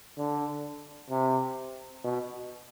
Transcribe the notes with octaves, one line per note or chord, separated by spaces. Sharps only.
D3
C3
B2